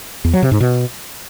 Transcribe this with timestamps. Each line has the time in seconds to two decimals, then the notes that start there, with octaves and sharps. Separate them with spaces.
0.24 E2
0.33 F#3
0.42 C3
0.51 G#2
0.60 B2